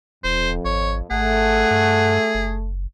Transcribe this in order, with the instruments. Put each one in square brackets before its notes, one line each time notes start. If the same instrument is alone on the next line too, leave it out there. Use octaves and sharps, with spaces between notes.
[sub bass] D#1 [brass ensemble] F2 [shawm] C5
[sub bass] G#1 [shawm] C#5
[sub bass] G#1 [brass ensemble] A3 [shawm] G#4 [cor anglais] F#5
[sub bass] G2
F#1